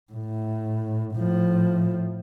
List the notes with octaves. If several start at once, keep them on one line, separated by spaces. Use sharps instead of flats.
A2
A2 F3